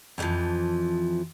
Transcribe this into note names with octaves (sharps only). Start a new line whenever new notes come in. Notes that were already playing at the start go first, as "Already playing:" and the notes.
F2 A#2 D3 E3 F3